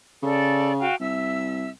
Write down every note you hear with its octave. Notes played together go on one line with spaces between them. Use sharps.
C#3 A4 D5
F#4 F5 G5
C2 E5 E6